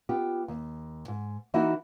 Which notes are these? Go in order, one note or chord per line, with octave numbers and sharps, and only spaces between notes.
B3 F4 G4
D#2
G#2
E3 A#3 D#4 E4 F#4